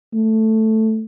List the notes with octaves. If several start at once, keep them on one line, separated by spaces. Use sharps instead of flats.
A3